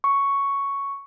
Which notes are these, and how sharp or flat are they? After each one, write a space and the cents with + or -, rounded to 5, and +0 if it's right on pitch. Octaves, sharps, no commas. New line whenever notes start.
C#6 +5